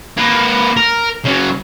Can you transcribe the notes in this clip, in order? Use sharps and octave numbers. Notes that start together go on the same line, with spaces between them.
A#3 B4
A#4
C#3 F#3